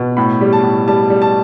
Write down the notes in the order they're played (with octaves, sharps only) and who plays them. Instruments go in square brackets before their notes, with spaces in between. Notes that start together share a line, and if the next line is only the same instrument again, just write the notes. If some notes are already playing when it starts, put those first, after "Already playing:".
Already playing: [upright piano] B2
A2 B5
G3
A5
A2
G3 A5
G3
A5